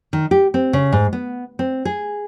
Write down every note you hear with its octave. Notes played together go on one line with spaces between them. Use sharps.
D#3
G4
C4
C#3
G#2
B3
C4
G#4